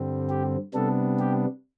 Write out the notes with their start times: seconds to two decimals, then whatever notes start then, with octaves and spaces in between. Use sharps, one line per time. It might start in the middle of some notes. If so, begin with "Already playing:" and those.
Already playing: G2 D3 G3 C4
0.29 G4
0.74 C3 G3 B3 D4 A4
1.19 G4